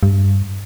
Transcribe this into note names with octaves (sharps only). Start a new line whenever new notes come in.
G2